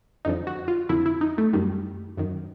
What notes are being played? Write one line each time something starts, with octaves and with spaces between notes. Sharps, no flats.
F2 D3 F3 D#4
F#4
F4
F2 D3 F3 E4
E4
D#4
A3
F#2 D#3 G3
F#2 D#3